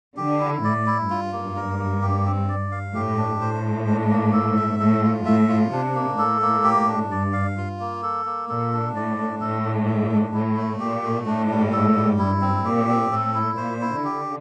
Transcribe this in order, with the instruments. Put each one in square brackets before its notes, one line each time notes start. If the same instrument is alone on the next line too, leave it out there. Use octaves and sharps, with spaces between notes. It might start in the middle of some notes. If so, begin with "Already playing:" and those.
[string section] D3 [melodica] G4
[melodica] E4
[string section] A2 [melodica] D5
[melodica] E4
[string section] G2 [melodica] F4
[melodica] A#3
A#4
A#3
G4
C4
D5
F5
[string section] A2 [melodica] G4
[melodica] D4
[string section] A2 [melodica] C5
[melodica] D4
D4
A#3
A4
E5
[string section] A2 [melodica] A4
[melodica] F4
[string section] A2 [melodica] E5
[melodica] F4
[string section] C3 [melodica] D4
[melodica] A#3
[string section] A2 [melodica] A4
[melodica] A#3
G4
D4
[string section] G2 [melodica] D5
[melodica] F5
F4
A#3
A4
A#3
[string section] A#2 [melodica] A4
[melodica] D4
[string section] A2 [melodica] D5
[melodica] D4
[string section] A2 [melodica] A4
[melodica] D4
E5
D4
[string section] A2 [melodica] E4
[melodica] A3
[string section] A#2 [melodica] G4
[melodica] A3
[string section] A2 [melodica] D4
[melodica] G3
A4
G3
[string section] G2 [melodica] E4
[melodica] C4
[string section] A#2 [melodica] G4
[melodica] C4
[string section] A2 [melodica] A4
[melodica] E4
[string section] A#2 [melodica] C5
[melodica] E4
[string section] D3 [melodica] G4